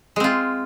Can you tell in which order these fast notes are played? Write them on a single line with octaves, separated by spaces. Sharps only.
G#3 C4 F4